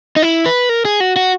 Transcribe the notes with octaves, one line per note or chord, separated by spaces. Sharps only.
D#4
E4
B4
A#4
G#4
F#4
F#4